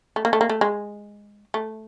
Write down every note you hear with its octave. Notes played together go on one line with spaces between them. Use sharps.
A3
A#3
A3
A#3
A3
G#3
A3